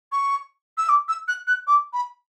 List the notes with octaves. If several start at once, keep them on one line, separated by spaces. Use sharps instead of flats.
C#6
E6
D6
E6
F#6
F#6
D6
B5